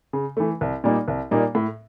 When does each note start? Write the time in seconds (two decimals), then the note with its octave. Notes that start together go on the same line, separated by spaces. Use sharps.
0.13 C#3
0.37 E3 A3
0.61 C2
0.84 A#2 G3 A#3 D#4
1.08 C2
1.31 A#2 G3 A#3 D#4
1.55 A2